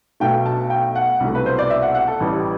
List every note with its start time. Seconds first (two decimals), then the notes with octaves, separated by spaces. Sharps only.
0.20 B1 B2 F#3 A3 G5
0.46 A5
0.70 G5
0.95 F#5
1.20 C2 B2 F#3 A3
1.35 B4
1.46 C5
1.59 D5
1.70 E5
1.82 F#5
1.95 F#5
2.08 A4
2.20 A1 A2 E3 G3